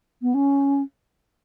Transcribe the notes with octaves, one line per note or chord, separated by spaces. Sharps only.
B3
C#4